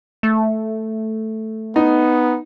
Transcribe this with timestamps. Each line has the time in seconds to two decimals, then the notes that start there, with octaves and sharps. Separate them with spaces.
0.23 A3
1.76 B3 D#4